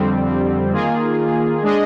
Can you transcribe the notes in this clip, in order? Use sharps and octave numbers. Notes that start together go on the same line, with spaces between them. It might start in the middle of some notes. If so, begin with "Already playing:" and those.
Already playing: F2 D3 G3 C4
D#3 A#3 F4 G#4
G#3 D4 G#4 D#5